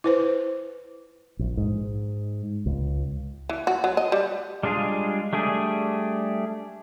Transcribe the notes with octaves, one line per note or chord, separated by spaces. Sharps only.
E4 B4 C5
A#1
G#2
C#2
E3
F#4
F#3
D#5
G3
G3 G#3 D4 F4 G#4
G3 A3 D4 G#4